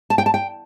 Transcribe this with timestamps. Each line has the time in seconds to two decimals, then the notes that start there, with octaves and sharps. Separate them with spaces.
0.10 A5
0.18 G5
0.26 A5
0.34 G5